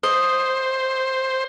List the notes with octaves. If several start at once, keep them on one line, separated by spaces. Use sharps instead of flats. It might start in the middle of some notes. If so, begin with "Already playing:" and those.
C5 D#5